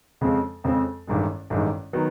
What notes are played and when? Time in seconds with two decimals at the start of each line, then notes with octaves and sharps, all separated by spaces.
0.21 F2 C#3 F3 G#3 C4
0.64 F2 C#3 F3 G#3 C4
1.07 A1 G2 D#3 G#3
1.50 A1 G2 D#3 G#3
1.93 D#3 F#3 B3